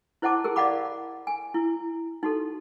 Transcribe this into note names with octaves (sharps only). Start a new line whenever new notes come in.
E4 C5 D#5 F#5 A5 D6
G4 G#4 A#4
D5 D#5 F5 F#5 B5 D6
G#5
E4
D#4 F#4 A4